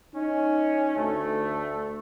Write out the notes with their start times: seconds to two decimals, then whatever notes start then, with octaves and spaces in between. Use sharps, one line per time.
0.15 C#4 D#4
0.96 D2 A3